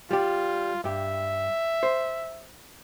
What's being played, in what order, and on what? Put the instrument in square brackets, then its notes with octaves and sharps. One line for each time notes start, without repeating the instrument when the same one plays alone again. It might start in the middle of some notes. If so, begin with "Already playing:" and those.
[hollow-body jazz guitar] G3 G4 [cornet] F4
[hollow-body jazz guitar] G2 G4 [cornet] E5
[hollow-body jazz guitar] C5